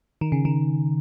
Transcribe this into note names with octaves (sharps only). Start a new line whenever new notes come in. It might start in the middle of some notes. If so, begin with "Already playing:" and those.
D#3
C#3
D#3